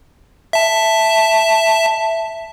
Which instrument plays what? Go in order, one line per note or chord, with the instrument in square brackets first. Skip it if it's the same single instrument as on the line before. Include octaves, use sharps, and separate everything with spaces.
[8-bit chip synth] E5 A5